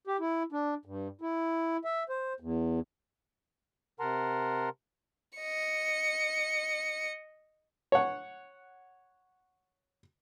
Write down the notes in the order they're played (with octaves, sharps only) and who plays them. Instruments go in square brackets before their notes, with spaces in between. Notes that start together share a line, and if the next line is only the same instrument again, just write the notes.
[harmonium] G4
E4
D4
G2
E4
E5
C5
E2
[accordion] C3 A#4 F#5 A5 A#5 C6
[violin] D#5 C#7
[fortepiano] C#5 F#5